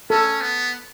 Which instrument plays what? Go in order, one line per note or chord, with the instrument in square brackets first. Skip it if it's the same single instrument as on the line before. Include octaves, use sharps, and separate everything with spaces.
[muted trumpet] C#4 [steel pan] A4
[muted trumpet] B3